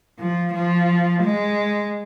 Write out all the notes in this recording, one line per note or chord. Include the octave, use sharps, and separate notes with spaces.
F3
F3
G#3